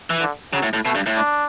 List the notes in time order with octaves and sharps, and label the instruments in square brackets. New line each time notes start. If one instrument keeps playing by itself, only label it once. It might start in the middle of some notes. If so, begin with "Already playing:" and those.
[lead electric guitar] E3
[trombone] D3
[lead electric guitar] C#3 [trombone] F#3
[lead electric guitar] A2
A2
[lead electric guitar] B2 [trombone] A3
[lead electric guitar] G2
A2
[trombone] D4